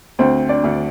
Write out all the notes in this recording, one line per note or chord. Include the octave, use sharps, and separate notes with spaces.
D2 C4 C5
D4 D5
D2